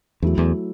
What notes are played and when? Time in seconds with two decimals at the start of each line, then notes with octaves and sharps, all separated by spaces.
0.22 E2 F#3 A3 E4
0.38 E2